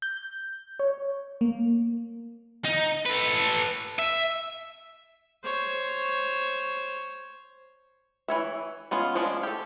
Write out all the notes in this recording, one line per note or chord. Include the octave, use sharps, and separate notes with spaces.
G6
C#5
A#3
D#4
A4 B4
E5
C5 C#5
E3 C#5 E5
G#3 B3 C#4 F4
F3 G#3 C#4 D4
G4 A4